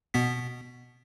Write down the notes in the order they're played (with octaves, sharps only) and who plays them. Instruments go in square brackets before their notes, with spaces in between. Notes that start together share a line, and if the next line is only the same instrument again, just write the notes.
[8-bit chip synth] B2 B3 B6